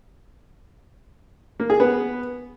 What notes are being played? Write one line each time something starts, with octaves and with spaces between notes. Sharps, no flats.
A#3
G#4
B3